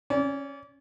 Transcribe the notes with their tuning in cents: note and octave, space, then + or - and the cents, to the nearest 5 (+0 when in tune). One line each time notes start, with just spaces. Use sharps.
C#4 -10 D5 -35